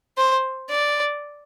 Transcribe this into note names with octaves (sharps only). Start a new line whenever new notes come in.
C5
D5